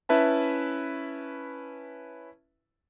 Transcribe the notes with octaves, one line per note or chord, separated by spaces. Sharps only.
C#4 E4 B4 E5 A5